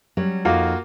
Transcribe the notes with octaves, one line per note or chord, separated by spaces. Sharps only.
F#3 G3 C#4
F2 A#3 D#4 F4 F#4